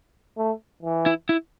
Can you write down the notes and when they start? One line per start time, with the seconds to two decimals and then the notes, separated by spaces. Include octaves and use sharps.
0.37 A3
0.83 E3
1.06 E4
1.29 E4